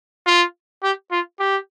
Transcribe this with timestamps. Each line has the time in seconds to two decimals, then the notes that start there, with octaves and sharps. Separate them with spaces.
0.27 F4
0.83 G4
1.11 F4
1.40 G4